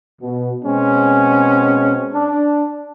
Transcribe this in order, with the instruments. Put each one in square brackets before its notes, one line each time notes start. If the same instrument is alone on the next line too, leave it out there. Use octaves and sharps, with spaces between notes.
[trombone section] B2
B2 G#3 C4 C#4
D4